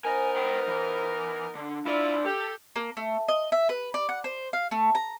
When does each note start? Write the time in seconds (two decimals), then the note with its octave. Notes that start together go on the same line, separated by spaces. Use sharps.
0.05 B3 D#4 A#4 C5 G#5
0.36 B4 G5
0.67 E3
1.55 D3 D4
1.85 C2 E4 F4 D5
2.25 G4 A4
2.76 A#3
2.97 A3
3.28 D#5
3.52 E5
3.69 B4
3.94 D5
4.09 F#5
4.24 C5
4.53 F5
4.71 A3
4.95 A#5